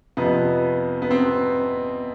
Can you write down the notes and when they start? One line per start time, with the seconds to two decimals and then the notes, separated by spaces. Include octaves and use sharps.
0.17 F2 C3 F3 B3
1.02 B3
1.11 C4